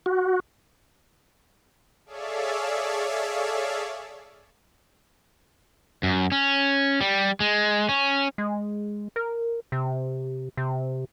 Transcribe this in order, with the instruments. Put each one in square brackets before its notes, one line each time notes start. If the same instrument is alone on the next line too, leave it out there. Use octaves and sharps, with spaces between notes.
[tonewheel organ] F#4
[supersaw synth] G#4 A4 C#5 D5 E5 F5
[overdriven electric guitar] F#2
C#4
G3
G#3
C#4
[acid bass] G#3
A#4
C3
C3